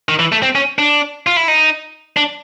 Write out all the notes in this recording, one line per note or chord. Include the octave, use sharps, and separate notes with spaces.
D#3
E3
A3
C4
C#4
D4
F4
E4
D#4
D4